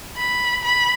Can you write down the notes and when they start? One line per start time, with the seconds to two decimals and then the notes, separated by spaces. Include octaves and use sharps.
0.17 B5
0.64 B5